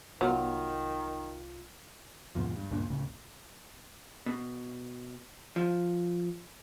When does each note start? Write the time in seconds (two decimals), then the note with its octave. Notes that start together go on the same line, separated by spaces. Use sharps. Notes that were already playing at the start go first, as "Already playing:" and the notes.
0.21 C2 D#3 F#3 B3 F4 F#4 F6
2.35 D#2 G#2 B2 F3
2.56 G2
2.70 C#2 G2 A#2 D4
2.90 C#2 A2 C#3
4.26 B2
5.56 F3